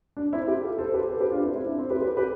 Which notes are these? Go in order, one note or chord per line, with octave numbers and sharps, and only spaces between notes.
D4
C4 E4
E4 G4
F4 A4
A4 C5
G4 B4
A4 C5
G4 B4
D4 F4
C4 E4
C4 E4
D4
C4 E4
G4 B4
G4 B4
G4 B4